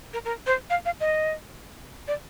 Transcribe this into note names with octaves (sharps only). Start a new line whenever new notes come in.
A#4
A#4
C5
F5
F5
D#5
D5